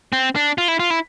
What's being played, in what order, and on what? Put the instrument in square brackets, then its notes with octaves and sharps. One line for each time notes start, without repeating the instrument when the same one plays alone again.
[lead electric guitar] C4
D4
F4
E4
F4
E4